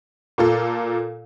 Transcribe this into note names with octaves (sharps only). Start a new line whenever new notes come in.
A#2 F4 A4